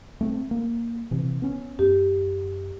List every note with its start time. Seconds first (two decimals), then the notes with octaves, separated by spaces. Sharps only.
0.21 A3 B3 C4
0.51 A#3
1.11 C3 E3
1.42 B3 C#4
1.79 F#2 G4